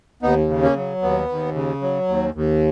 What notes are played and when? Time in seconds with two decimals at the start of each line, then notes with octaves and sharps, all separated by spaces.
0.22 D#2 B3 D#4
0.49 C#3
0.62 A#3 C#4
0.76 F#3
1.02 D#2 B3
1.29 D#2
1.55 C#3
1.82 F#3
2.08 D#2
2.34 D#2